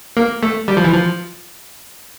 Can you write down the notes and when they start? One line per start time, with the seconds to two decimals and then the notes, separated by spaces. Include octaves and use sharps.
0.17 A#3
0.43 A3
0.68 G3
0.77 F3
0.84 E3
0.93 F3